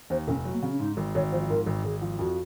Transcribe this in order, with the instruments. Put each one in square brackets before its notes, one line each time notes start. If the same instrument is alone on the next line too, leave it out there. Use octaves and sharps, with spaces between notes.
[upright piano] D#2 [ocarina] C5
[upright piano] F1 [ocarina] C#4
[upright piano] F#3
[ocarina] A#3
[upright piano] C#3 [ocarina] C4
[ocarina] C#4
[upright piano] G#2 [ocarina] D#4
[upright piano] G#1
[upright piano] G#1 [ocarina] C#5
[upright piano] F3 [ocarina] C5
[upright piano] G#2 [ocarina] A#4
[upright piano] G#1
[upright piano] G#1 [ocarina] G#4
[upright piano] F3
[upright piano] F2 [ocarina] F#4